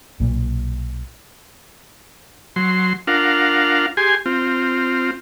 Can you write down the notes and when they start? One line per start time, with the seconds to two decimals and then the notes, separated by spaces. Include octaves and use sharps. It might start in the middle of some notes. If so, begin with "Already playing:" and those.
0.20 B1 A#2
2.56 F#3 C6
3.07 D4 F4 A#4 F5 F#5
3.97 G4 G#4 G#5 C6
4.26 C4 F4